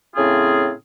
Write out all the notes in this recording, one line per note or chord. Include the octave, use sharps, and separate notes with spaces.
A2 C#3 C4 F4 G#4